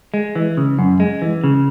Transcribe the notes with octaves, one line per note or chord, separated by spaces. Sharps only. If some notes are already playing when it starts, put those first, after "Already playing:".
G#3
E3
C#3
F#2
G#3
E3
C#3